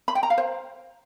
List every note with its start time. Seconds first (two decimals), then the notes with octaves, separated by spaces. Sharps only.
0.08 B5
0.15 G5
0.23 A#5
0.30 F5
0.38 C5